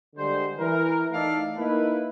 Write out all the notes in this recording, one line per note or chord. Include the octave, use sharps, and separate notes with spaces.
D3 G3 G#3 C5
E3 A#4
A3 D#4 A4 D5 F5
A#3 D#4 E4 B4